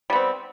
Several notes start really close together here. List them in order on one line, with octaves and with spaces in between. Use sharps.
G3 B3 C4